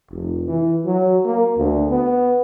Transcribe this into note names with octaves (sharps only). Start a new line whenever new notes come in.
F1
E3
F#3
A#3
D2
B3